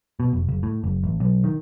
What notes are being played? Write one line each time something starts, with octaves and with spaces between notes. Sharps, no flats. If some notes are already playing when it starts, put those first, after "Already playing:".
B2
F1
F#1
A2
F#1
A1
B1
D#3